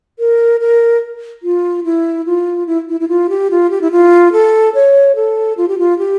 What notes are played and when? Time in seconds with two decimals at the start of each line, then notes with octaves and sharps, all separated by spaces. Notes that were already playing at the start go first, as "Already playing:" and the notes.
0.19 A#4
0.60 A#4
1.43 F4
1.84 E4
2.26 F4
2.67 E4
2.89 E4
3.00 E4
3.09 F4
3.29 G4
3.51 F4
3.70 G4
3.81 E4
3.91 F4
4.32 A4
4.75 C#5
5.16 A4
5.57 F4
5.68 G4
5.79 F4
5.99 G4